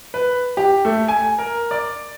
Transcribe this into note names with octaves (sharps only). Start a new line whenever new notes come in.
B4
G4
A3
G#5
A#4
D5